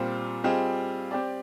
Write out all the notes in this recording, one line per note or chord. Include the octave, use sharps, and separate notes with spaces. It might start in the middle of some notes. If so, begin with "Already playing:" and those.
Already playing: A#2 G3 C4 F4 C5
G3 C4 F4 G#4 D#5
C4 G4 D5